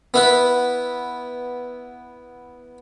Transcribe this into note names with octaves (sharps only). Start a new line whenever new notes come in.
B3 E4 B4